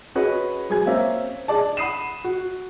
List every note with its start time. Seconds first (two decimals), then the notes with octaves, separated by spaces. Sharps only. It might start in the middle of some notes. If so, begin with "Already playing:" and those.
0.15 C#4 F#4 G#4 B4 D#5
0.69 F#3 G#3 G#4 G#5 G#6
0.86 A#3 C4 C#4 E5 F5
1.48 D4 G#4 D5 A5
1.77 F#5 B5 D#6 C7 D#7 E7
2.24 F#4